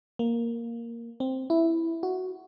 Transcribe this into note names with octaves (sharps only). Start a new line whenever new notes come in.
A#3
C4
E4
F#4